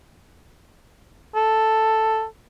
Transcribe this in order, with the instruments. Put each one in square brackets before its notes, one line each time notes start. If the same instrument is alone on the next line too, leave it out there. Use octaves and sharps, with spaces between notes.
[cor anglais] A4